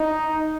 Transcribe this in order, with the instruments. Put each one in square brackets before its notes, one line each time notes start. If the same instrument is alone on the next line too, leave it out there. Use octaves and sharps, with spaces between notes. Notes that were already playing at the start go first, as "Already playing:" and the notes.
Already playing: [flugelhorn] D#4